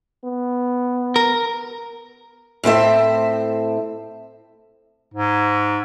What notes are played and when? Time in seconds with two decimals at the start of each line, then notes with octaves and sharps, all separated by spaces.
0.25 B3
1.16 A#4
2.64 A2 C4 C5 E5
5.14 G#2